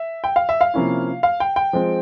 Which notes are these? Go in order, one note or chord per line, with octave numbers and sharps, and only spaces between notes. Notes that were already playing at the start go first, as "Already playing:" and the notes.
Already playing: E5
G5
F5
E5
F5
C3 F3 A#3 C#4 E4
F5
G5
G5
F3 G#3 C4